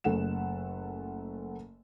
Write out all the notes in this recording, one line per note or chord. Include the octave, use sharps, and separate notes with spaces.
F#1 A3 A4 F#5 E7